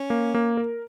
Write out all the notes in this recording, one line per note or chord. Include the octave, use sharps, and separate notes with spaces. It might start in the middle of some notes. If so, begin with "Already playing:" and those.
Already playing: C#4
A#3
A#3
A#4